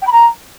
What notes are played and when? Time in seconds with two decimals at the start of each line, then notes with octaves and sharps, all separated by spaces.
0.02 G5
0.07 B5
0.12 A#5